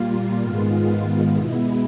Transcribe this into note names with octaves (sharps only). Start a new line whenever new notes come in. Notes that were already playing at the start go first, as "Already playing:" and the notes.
Already playing: A#2 G3 A#3 F4
G#2 D#3 G#3 B3
B2 G#3 B3 E4